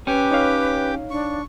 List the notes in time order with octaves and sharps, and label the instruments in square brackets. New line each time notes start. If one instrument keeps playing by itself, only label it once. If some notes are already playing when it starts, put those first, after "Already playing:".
[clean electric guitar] C#4 [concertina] G4 G5 D6 [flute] B4
[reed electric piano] D#4 C#5 F5
[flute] D4 [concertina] C#6